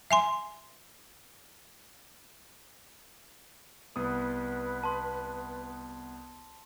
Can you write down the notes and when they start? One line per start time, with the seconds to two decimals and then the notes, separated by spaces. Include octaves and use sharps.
0.11 E5 G#5 C6
3.96 C2 B3 B4 D#6
4.84 A5 C6